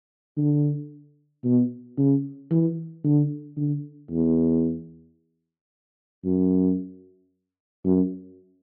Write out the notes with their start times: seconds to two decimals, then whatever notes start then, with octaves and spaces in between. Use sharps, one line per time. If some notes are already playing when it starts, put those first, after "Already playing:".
0.37 D3
1.44 B2
1.98 C#3
2.51 E3
3.04 D3
3.57 D3
4.11 E2
6.25 F#2
7.85 F#2